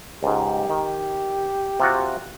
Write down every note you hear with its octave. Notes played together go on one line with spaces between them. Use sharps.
C#2 G#2 G4
D#3
C3 F4 F#4